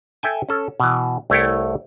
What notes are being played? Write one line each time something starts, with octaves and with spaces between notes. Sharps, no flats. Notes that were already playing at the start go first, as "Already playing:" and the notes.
A4 E5 G5 G#5
C#4 A4
B2 E3
C2 A3 E4 C#5 G5